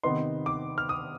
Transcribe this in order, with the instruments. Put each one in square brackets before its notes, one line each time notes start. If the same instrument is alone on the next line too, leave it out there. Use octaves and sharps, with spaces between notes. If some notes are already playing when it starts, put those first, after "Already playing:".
[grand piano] C3 D#3 B3 D#4 C6
D6
F6
D#6